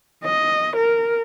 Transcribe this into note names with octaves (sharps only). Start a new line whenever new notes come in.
D#5
A#4